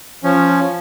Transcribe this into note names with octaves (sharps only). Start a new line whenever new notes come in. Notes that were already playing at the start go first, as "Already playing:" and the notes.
F3 C#4